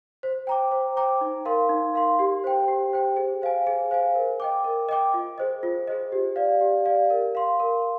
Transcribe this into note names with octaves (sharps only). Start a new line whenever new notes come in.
C5
G5 A#5 D6
C5
G5 A#5 D6
D#4
A#4 F5 C6
D#4
A#4 F5 C6
G4
C5 G5
G4
C5 G5
G#4
C5 F5 G#5
G#4
C5 F5 G#5
A#4
D#5 G5 D6
A#4
D#5 G5 D6
F4
G#4 C5 D#5
F4
G#4 C5 D#5
G4
D5 F5
G4
D5 F5
A#4
F5 C6
A#4